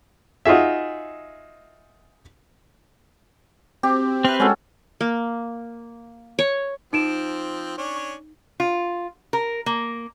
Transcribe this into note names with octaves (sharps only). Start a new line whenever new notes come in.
D#4 F4 F#4 G#4 E5
C4 G4
C4 B4 E5 F6 F#6
G#3 C#4 F#4 A4
A#3
C#5
F3 C4 D#4 D7 E7
C#4 D4 C#5
F4
A#4
A#3